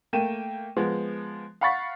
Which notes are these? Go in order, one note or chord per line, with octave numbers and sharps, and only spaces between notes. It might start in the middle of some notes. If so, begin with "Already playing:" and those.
A3 A#3 G5 D#7 E7
F3 G#3 B3
F5 F#5 B5 C#6 A6 B6